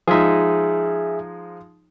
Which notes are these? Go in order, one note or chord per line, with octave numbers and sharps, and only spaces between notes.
F3 G#3 D#4 G#4 E5